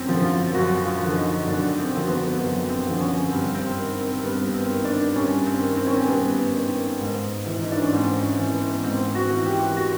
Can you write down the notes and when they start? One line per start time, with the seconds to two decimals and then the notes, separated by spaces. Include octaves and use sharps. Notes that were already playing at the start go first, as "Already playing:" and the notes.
Already playing: F#2 C4 C#4
0.09 D3 F3
0.24 F4
0.55 F#2 F#4
0.85 F4
1.01 D3 F3
1.16 D#4
1.47 F#2 D4
1.78 C4
1.93 D3 F3
2.08 B3
2.39 F#2
2.70 C4
2.86 D3 F3
3.01 C#4
3.31 G2 C4
3.55 C4
3.77 D#3
4.01 C4
4.23 G2 B3
4.54 C4
4.70 D#3
4.85 D4
5.15 G2 C#4
5.46 C4
5.62 D#3
5.77 C4
5.87 C#4
5.96 C4
6.07 G2 B3
6.54 D#3
7.00 G#2
7.46 E3
7.62 D#4
7.72 D4
7.82 C#4
7.92 G#2 C4
8.22 C#4
8.39 E3
8.54 B3
8.84 G#2 C4
9.15 F#4
9.30 E3
9.45 G4
9.77 F#4